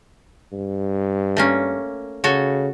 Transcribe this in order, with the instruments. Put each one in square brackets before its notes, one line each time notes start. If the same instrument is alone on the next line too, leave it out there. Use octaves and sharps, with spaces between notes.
[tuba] G2
[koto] A3 A#3 C#4
[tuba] C#3 [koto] F#4 A4 C#5